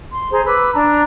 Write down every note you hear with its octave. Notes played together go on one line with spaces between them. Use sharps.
C6
G#4 C5 A#5 C6
B4 B5 D6 E6
D4 A5 A#5